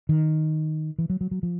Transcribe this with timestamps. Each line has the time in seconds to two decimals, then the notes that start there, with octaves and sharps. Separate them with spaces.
0.09 D#3
0.98 E3
1.10 F#3
1.21 F#3
1.31 F#3
1.43 F3